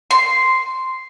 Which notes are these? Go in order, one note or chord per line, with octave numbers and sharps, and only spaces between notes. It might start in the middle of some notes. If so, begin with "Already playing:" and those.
C6